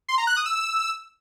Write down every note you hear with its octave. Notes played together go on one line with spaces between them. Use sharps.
C6
A#5
F#6
D#6
E6